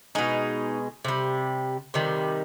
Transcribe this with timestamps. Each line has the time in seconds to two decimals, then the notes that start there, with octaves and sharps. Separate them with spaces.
0.15 B2 G#3 D#4
1.05 C3 G3
1.94 C3 D#3 G3